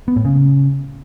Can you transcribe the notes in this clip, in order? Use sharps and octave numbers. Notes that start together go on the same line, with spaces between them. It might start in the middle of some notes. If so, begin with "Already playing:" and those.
B3
A2
C#3